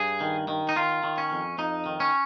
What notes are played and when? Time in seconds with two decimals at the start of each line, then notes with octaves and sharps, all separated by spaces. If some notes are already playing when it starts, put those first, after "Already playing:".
Already playing: G2 G#4
0.21 D#3
0.48 D#3
0.69 D#4
0.76 D#3 F4
1.04 D#3
1.18 C#4
1.32 F2
1.58 F2 D#4
1.86 D#3
2.00 C#4